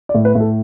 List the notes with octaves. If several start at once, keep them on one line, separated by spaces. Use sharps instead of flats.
D5
A2
B4
A2
A4